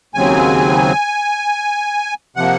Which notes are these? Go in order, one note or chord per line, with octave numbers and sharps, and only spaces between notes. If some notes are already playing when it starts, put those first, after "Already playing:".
D#2 C#3 F#3 C4 G#5
C3 F3 A#3 F#5